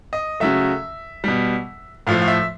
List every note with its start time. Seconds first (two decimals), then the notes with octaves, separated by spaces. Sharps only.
0.13 D#5
0.40 C#3 F#3 A3 E5
1.24 B2 G3
2.07 A2 F3 A3 F5
2.22 F5
2.28 E5